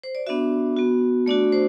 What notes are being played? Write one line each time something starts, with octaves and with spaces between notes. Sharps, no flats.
C5
D5
B3 D4 F#4 E5
B3 F#4
A3 D4 F#4 D5
C5